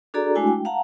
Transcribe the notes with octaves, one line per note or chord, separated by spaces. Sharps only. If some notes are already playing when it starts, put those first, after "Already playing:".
D4 F#4 G#4 A4 D5 A#5
G#3 A3 D4 E4 F#4 G#5
G5
F5 F#5 A5 A#5